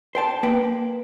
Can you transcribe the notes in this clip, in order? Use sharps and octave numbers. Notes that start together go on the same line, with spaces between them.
C5 G5 A5
A#3 B4 G5